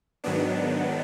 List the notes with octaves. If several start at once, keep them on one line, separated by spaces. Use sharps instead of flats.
G#2 D#3 F#3 B3 D4